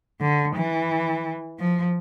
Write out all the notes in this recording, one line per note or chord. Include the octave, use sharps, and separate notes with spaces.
D3
E3
F3